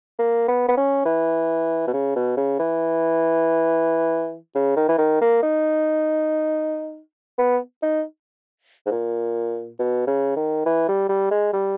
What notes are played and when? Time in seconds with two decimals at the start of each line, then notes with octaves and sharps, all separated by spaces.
0.19 A#3
0.48 B3
0.68 B3
0.77 C#4
1.06 E3
1.87 B2
1.93 C#3
2.16 B2
2.37 C#3
2.59 E3
4.55 C#3
4.77 D#3
4.89 E3
4.98 D#3
5.21 A#3
5.42 D#4
7.38 B3
7.83 D#4
8.86 G#2
8.91 A#2
9.79 B2
10.07 C#3
10.36 D#3
10.66 E3
10.88 G3
11.09 G3
11.31 G#3
11.53 G3